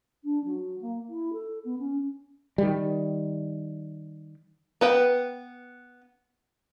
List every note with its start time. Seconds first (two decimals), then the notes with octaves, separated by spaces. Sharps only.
0.24 D4
0.44 F#3
0.81 A#3
1.09 E4
1.33 A4
1.64 B3
1.79 C#4
2.58 D#3 G3
4.81 B3 B4 G5